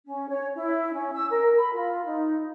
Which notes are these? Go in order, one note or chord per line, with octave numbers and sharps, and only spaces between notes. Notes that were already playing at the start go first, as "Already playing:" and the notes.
C#4
C#5
E4
C#4
E6
A#4
B5
F4
D#4